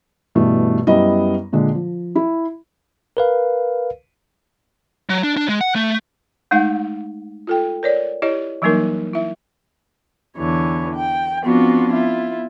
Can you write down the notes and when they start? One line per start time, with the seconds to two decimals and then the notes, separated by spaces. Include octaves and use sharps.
0.35 G2 B2 E3 A3
0.87 F#2 G3 B3 E4 D#5
1.53 A#2 D3 G#3
1.75 F3
2.15 E4
3.17 A#4 B4 F5
5.09 F#3
5.23 D4
5.37 D4
5.49 G#3
5.61 F#5
5.76 A3
6.51 G#3 A3 D#4 F5 F#5
7.47 F4 A4 G5
7.83 A#4 C#5 D5
8.22 E4 G4 C#5 D#5
8.62 E3 F#3 G3 A#3 D#4 A#4
9.13 E4 E5
10.38 E2 D3 E3 C#5
10.95 G5
11.44 F3 B3 C4 D4 F4 F#4
11.92 B3 E4 F4